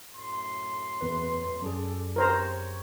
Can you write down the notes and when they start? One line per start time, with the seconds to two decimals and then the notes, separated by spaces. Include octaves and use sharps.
0.14 F#2 A2 C6
1.01 E2 B4
1.62 F#2 G#4 A4 D5
2.16 G4 A#4 C5 C#5 A#5